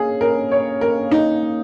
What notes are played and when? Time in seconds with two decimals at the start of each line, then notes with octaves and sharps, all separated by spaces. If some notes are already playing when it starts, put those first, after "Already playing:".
Already playing: A#3 C#4 G#4
0.21 C#3 A#4
0.51 C#3 C#5
0.81 A#3 A#4
1.11 D#4 C#5
1.42 A#3